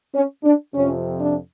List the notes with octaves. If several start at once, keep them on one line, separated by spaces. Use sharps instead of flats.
C#4
D4
F2 C3 F3 C#4
D4